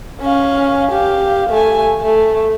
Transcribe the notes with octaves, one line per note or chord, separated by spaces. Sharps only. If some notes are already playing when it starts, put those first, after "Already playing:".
C#4 F5
G4 F5
A3 G#5
A3